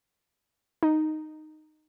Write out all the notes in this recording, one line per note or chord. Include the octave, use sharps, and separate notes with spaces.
D#4